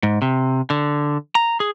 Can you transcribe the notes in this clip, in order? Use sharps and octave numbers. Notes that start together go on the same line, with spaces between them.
G#2
C3
D3
A#5
G#4